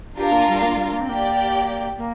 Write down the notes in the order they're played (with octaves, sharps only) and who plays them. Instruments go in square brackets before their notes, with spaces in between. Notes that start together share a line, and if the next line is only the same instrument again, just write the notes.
[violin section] D4 F4 A#4 F5 [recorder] G4
[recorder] A#3
G3
A#3
G3
A#3
C4
[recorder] A#3 [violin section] G4 D5 G5
[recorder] A#3